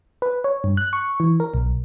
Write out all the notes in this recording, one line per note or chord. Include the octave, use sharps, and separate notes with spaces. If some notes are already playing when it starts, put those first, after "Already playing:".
B4
C#5
G2
F#6
C#6
E3
A#4
B1